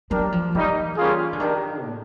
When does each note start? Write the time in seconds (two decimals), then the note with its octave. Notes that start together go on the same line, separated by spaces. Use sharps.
0.11 F#3 D4 G4 A#4
0.32 F3
0.54 E3 G3 A#3 D#4
0.97 G3 A#3 C#4 F4 G#4
1.33 D3
1.40 D#3 D4 G4 A#4
1.83 A2